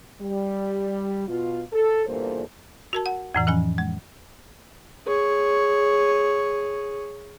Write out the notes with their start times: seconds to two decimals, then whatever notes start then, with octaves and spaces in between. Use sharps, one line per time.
0.21 G3
1.28 B2 F4
1.73 A4
2.07 E2 G2 A#2 A#3 A4 C5
2.93 F#4 A#4 A5
3.06 F#5
3.34 F2 A2 E3
3.47 E3 F3 C#4 G#5
3.78 G#3
5.06 G#4 C#5